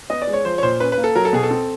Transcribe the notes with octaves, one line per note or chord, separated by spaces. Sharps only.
B3 D#5
D5
G#3
C#5
F3 C5
C#5
A#2 C5
C#4 B4
B4
A#3
A4
F#3 A#4
A4
B2 G#4
A4
C4